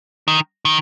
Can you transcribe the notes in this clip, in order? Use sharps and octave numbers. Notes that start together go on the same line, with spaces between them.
D#3
D#3